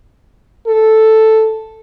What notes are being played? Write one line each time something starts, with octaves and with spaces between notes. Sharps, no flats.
A4